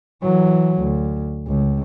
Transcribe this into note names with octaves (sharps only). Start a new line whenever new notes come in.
E3 F#3
D2
C#2